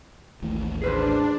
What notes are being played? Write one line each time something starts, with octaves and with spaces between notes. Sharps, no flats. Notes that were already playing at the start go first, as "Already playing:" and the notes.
A1 D#2 A2
D4 G#4 B4 C5